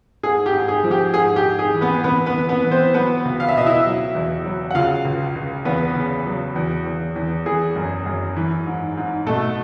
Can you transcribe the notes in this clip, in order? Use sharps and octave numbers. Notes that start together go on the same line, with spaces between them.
G#2 G#4
G4
G#2
G#4
F3
G4
G#2 G#4
G4
G#2
G#4
E3
B3 B4
E3 B3 B4
B3 B4
E3
B3 B4
E3
C4 C5
F#3 B3 B4
C#2
F5
E5
B2 D#5
E4 E5
F#3
E2
F#3
F#5
C#3 F4 F5
C#2
C#2
E2 B3 B4
C#3
F#3
E2
E2
E2
E3 G#4
F#2
F#2
E3
G#2
G#2
B2 A3 A4